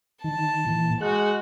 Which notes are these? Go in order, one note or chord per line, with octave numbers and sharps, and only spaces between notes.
D#3 A5
A#2 E3
G#3 F#4 F#6